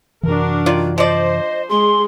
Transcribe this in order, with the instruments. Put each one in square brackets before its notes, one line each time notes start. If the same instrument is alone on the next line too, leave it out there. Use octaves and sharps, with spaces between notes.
[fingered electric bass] F#2 C3 E3 [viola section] D4 F#4 A#4
[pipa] D#3 F4 D5
[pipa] F3 D5 [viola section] C5 [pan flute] D#5
[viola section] G#3 G#4 [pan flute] C6